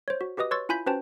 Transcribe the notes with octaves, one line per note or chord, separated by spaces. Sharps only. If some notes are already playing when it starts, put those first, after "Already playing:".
C5 C#5
F#4
F#4 G4 B4 D#5 D#6
B4 C#5 C6 C#6 E6 A6
E4 F4 G#5 B5 G6 B6
C#4 F#4 B4 C5 G5 A5